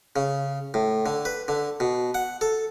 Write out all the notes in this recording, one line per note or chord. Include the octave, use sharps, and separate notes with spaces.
C#3
A2
D3
B4
D3
B2
F#5
A4